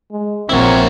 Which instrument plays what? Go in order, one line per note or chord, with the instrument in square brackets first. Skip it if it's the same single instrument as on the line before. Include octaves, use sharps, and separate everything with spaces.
[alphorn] G#3
[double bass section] A#1 F3 A#3 [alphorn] C4 [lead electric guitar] E4 F#4 [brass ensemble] A#4 C#5